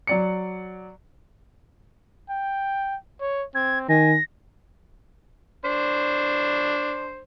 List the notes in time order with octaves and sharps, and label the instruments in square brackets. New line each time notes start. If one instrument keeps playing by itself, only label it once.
[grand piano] F#3 D5 C#7
[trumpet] G5
C#5
[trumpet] C4 [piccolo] G#6
[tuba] D#3 [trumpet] G#5 [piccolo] A#6
[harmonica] D4 C5